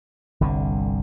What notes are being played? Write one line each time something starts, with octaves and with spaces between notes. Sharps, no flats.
G1 C2 D3